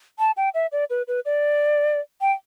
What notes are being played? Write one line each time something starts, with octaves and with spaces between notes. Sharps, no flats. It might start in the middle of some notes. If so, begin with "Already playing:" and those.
A5
G5
E5
D5
B4
B4
D5
G5